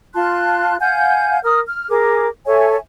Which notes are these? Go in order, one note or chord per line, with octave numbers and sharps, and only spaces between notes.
F4 A5 C6 F#6
F5 F#5 G#5 G6
A#4 D#6 F6
F6
G#4 A#4 D6
A4 C#5 E5 G#5